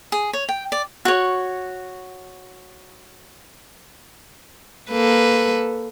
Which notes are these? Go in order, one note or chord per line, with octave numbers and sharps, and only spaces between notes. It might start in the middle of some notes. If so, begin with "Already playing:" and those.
G#4
C#5
G5
D5
F#4 C#5
A#3 A4 B4